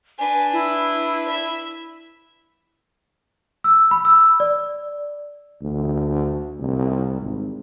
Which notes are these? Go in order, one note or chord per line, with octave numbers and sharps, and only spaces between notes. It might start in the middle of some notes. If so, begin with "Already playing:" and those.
D4 B4 G#5
E4
E5 B5
E6
B5
E6
D5
D2
C2
G#1